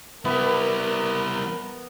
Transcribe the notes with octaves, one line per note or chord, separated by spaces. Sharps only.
G3 B3 E4 A#4